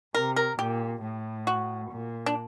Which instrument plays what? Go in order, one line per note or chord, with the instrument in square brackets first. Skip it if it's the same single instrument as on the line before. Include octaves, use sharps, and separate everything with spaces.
[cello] C3 [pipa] A#4
[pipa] A#4
[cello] A#2 [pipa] G4
[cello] A2
[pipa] F#4
[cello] A#2
[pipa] D4